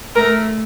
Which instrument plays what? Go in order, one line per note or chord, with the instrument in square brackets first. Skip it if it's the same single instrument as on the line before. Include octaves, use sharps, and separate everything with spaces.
[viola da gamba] A3 [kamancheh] A#4